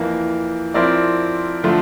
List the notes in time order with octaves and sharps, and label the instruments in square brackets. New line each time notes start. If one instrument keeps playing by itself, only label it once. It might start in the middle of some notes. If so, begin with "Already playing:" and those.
Already playing: [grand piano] F2 E3 A#3
F3 C4 E4 A#4 D5
D3 F3 A3